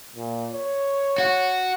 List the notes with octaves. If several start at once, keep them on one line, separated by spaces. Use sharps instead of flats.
A#2
C#5
F#4